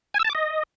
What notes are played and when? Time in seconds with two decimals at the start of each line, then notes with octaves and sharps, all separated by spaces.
0.14 G#5
0.19 E6
0.25 A5
0.30 D6
0.35 D#5